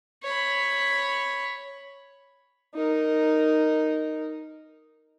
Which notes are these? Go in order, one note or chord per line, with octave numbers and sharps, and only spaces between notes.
C#5 B5
D#4 A#4